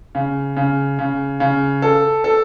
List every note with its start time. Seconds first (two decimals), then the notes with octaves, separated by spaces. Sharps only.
0.15 C#3
0.56 C#3
0.99 C#3
1.40 C#3
1.82 A4
2.24 A4